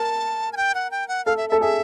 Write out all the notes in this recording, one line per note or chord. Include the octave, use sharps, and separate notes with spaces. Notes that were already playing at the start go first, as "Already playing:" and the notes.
Already playing: A#4 A5
G#5
G5
F#5
G5
F#5
A4 F5
E5
A4 E5
G#4 E5